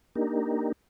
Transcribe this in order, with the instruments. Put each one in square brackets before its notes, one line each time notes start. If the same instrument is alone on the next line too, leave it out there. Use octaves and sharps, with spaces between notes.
[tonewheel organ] A#3 D4 D#4 G4 A#4